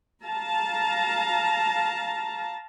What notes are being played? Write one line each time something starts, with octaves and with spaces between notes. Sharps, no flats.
F5 A5 A#5